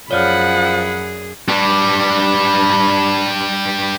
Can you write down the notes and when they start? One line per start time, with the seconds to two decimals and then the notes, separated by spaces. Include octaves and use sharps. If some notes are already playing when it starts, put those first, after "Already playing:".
0.11 F#2 F3 G#4 C#5 D5 F#5 B5 F6
1.49 G3 D4